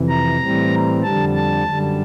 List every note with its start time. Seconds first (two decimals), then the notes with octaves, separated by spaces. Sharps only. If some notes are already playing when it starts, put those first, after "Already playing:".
Already playing: F2 C3 E3
0.09 A#5
0.40 A2 E3 G3 C4
1.03 F2 D3 G3 A5
1.35 A5
1.66 F#2 D3 G3